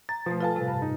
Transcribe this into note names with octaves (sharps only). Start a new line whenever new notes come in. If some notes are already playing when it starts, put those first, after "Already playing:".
A#5 A6
B2 F3 A3
F4 A4 B4 F5 G#5 A5
A2 C3 G3
G2
D#4